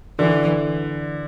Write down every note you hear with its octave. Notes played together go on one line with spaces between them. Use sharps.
D3 E3